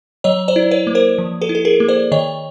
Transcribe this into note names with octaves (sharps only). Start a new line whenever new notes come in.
F#3 C#5 D#5
C5 D5
E4
B4 C#5
A#3
A#4 C5
F3
A4 B4
E4
A4
G#4 A#4
A#3
C5 D5
D#3 C#5 D#5